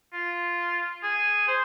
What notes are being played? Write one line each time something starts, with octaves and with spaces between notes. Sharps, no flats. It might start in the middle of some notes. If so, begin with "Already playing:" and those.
F4
G#4
C5